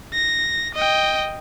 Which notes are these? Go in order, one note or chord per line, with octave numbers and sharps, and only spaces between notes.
A#6
D#5 G5